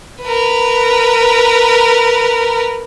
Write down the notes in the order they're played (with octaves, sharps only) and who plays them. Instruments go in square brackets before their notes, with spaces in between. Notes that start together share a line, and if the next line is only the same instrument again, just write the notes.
[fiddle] A#4 B4